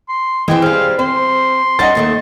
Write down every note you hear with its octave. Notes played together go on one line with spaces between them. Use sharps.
C6
E3 G#3 C4 G5
G3 C4 G#4 F5
C4 C5 C6
G3 C#4 D#4 D#5 F#5 A6
D#2 D#3 A3